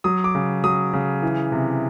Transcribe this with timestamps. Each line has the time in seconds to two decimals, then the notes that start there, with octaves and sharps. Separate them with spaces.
0.04 F#3 D#6
0.24 D6
0.35 C#3
0.64 F#3 D#6
0.93 C#3
1.23 E3
1.52 C3